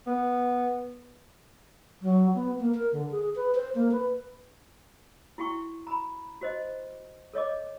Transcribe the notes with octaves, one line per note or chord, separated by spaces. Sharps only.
B3
F#3
B3
A#3
A#4
D3
G#4
B4
C5
A#3
B4
E4 F#4 G5 C#6
A#5 B5
F#4 C5 D#5
A4 C#5 D#5 D6